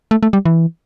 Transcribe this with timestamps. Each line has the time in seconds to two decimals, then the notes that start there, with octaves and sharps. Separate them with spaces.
0.11 A3
0.23 A3
0.33 G3
0.46 E3